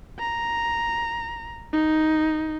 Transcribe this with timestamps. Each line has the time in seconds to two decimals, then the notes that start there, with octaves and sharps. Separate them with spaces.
0.19 A#5
1.73 D#4